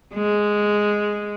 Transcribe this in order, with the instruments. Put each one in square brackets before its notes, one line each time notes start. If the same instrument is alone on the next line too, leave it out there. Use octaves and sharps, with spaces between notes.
[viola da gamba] G#3